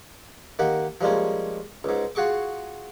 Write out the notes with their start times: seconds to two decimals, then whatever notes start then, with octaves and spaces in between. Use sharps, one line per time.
0.59 D#3 A#3 G4 F#5
1.01 F3 G3 G#3 A#3 C#4
1.84 C#2 G#2
2.15 F4 F#4 G#4 C#6 D6